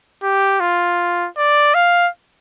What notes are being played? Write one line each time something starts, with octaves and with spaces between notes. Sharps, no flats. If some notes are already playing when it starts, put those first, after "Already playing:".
G4
F4
D5
F5